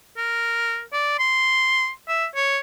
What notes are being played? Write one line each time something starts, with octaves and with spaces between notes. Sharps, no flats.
A#4
D5
C6
E5
C#5